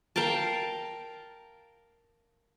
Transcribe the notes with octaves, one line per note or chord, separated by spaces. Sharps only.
A#4 F5 G5 A5